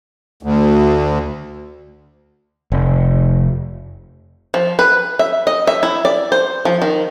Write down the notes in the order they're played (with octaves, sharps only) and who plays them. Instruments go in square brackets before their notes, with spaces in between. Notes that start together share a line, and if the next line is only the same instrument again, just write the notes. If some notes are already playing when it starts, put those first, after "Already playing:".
[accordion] D2
[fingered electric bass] F1
[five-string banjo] F3
B4
E5
D#5
E5
E4
D5
C5
F3
D#3